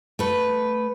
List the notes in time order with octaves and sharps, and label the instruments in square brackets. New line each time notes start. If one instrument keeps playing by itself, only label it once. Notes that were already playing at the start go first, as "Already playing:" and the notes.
[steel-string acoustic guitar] A3 B4